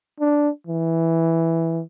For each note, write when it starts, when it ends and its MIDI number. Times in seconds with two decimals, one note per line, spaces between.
0.20 0.49 62
0.67 1.82 52